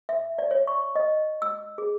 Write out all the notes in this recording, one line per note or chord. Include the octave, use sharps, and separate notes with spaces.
E5
D5
C#5
C#6
D#5
E6
G#4